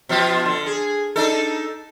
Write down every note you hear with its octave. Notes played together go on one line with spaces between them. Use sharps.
B2 F3 F4
D3
G#4
D4 D#4 A4